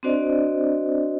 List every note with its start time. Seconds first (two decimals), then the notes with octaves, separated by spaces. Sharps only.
0.03 C4 D4 F#4 C5 D5 D#5